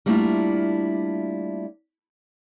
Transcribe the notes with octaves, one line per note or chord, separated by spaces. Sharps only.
G3 A3 A#3 D4 E4 F4